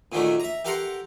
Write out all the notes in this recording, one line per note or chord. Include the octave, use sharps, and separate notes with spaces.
A#2 D3 D#3 F#3 A3
E5 A#5
G4 A4 A#4 F#5 A#5 C6